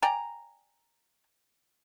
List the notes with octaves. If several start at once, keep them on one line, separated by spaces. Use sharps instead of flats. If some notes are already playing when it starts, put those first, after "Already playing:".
D5 G5 G#5 A#5